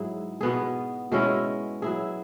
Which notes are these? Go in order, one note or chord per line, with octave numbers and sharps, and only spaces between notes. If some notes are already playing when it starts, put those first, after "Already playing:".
Already playing: G#2 F#3 E4 G#4
B2 B3 G#4
B2 G#3 C#4 E4
F#3 E4 G#4